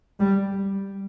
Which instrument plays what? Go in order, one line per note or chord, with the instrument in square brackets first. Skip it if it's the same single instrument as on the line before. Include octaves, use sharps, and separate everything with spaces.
[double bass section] G3